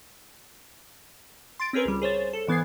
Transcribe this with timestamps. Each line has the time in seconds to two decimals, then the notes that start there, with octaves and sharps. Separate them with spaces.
1.60 C6 A6 D7
1.73 C4 C#4 G#4 A#4 B4
1.85 C#2 G3
2.02 G#4 C5 C#5 A6
2.33 A4
2.47 G#2 E3 B3 G#6 C7